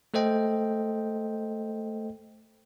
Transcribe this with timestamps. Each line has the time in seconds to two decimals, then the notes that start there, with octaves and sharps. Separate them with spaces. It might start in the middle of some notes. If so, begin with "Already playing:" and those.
0.14 A3 A4 C5 D#5 G5